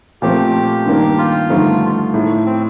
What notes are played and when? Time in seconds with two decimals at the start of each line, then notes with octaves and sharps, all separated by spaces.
0.22 A#2 F3 A3 C4 G4
0.86 G2 D#3 A#3 D4
1.18 F4
1.49 G2 D3 F3 A3 D#4
2.14 A2 A3 D#4
2.46 C4